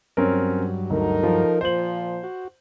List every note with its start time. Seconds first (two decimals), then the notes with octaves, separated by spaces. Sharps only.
0.17 G2 F#3 C4 C#4 A#4
0.90 D2 D#4 A4 A#4
1.23 F3
1.61 A#2 F3 C5 F#7
2.23 F#4